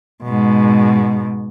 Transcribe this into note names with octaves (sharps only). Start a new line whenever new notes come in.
G#2 B2